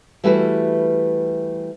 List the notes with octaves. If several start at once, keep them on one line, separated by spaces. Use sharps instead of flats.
E3 G3 A3 E4 F#4 B4